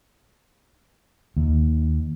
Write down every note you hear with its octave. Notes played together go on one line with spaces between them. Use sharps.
D#2